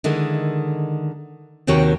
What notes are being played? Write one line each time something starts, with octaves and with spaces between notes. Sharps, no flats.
D3 D#3 G#3 E4
D#2 C3 D#3 F#4 C#5 G5